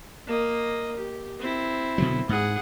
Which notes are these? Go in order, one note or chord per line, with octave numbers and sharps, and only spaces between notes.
A#3 D#5
G4
C4 E4
B2 D3 F#3
G#2 G#4 F#5